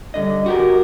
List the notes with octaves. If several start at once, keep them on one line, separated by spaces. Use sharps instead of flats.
G2 D3 D#5
F#4 G4 A#4